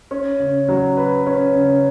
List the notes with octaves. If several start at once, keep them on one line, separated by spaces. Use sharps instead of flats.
C#4
C#3
F#3
B4
C#4
C#3